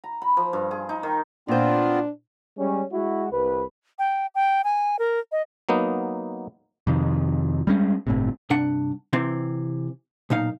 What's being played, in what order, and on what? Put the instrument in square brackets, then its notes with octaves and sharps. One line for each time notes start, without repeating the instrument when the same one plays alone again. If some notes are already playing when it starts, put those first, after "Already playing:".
[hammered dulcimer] A#5
B5
F3
G2
G#4
D#4
D#3
[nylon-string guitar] A#2 C5 [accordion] B3 C4 F4 [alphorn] D4
[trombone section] G3 G#3 C#4
G#3 E4 F#4
C2 B4
[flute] G5
G5
G#5
A#4
D#5
[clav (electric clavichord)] F#3 A#3 B3 D#4
[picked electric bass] F2 C3 D#3
G3 G#3 C#4
G1 A2 C3
[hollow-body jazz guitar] G2 C3 D4 F#5
C3 E3 C4
B1 A#2 D#4 F5